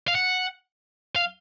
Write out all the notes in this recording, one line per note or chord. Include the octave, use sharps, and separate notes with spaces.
F5
F#5
F5